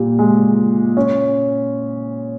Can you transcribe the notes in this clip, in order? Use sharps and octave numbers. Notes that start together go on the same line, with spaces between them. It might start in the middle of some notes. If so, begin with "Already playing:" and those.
Already playing: A#2 G3
G#3
C#4